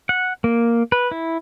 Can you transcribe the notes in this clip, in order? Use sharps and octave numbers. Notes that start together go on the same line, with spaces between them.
F#5
A#3
B4
E4